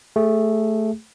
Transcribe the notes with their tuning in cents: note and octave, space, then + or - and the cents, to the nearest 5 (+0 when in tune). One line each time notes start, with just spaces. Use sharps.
A3 +0 G#4 -20